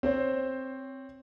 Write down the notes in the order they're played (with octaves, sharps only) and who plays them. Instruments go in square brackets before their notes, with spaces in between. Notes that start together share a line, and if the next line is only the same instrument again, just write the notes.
[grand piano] C4 C5 C#5